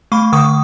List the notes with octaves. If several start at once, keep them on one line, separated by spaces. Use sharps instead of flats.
A3 B5 C#6
D3 C#6 D#6